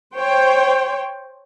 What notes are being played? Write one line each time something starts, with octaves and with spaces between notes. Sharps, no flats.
C5 C#5 G5